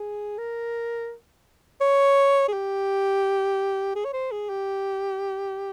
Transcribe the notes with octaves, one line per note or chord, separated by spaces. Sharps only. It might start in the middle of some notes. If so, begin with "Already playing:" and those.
Already playing: G#4
A#4
C#5
G#4
G4
G#4
C#5
C5
G#4
G4